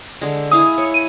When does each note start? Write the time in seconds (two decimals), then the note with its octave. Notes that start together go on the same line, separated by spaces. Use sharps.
0.21 D3 G#3
0.51 E4 F5 G#5 D#6
0.78 C#5
0.94 D#7